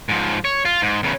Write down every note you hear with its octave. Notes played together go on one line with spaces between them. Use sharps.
G#2 F3
C#5
F4
G#2
E2 C#3